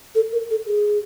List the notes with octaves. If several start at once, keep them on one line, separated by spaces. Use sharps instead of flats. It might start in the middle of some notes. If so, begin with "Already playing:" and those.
A4
A#4
A4
G#4